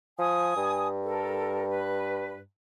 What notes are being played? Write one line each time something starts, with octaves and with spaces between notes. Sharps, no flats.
F3 G#5 D#6
G2
A4 A#4
B4